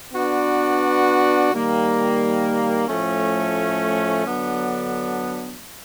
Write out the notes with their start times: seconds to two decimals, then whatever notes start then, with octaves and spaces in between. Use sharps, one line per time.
0.13 B3 D4 F#4 B4 D5
1.51 D#3 G3 A#3
2.88 A2 F3 A3 C#4
4.25 D3 F#3 B3 D4